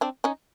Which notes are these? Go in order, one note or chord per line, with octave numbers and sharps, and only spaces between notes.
C4 D4
C#4 D#4